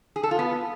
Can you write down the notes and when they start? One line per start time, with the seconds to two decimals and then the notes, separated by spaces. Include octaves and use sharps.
0.16 G#4
0.23 A4
0.31 F4
0.39 B3